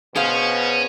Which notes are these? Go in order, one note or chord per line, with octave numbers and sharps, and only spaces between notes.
B2 C#4 G#4 C5 F5